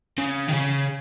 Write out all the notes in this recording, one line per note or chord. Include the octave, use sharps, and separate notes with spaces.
C#3
D#3
C#3